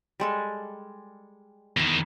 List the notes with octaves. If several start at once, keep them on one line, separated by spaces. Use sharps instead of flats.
G3 G#3 A4
E2 D#3 A#5 B5